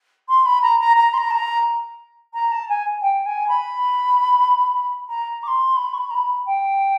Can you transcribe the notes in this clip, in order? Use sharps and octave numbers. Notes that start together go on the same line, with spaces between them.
C6
B5
A#5
A#5
A#5
C6
A#5
A5
A#5
A#5
A5
G#5
G5
G#5
B5
A#5
D6
C6
B5
C#6
B5
A#5
B5
G5